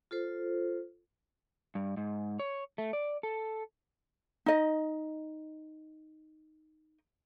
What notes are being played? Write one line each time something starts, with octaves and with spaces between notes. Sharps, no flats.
F4 A4 C5
G2
G#2
C#5
A3
D5
A4
D#4 D#5